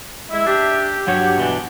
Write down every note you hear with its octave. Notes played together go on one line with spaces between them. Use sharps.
G#3 E4 E5
D4 G4
G2 F#3 C#5 F#5
B2 E3 D4